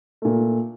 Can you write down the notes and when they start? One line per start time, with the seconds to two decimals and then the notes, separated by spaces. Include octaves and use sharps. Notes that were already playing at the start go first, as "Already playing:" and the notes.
0.22 A#2 A3